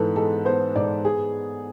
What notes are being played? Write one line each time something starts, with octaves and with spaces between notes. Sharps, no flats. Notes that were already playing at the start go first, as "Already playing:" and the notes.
Already playing: G#2 E3 B3 A4 B4
G#3 A4
B3 C5
G#2 D5
G#4